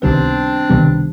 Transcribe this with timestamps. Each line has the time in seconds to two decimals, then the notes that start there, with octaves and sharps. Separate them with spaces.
0.02 C#2 C3 D#3 G3 B3 C4 D4
0.70 C#2 C3 D#3 G3 B3